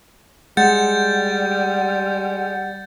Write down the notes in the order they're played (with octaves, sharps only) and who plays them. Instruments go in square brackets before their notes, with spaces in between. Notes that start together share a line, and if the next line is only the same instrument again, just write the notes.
[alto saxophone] G3 [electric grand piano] G#3 [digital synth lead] F#5 [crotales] G6 A6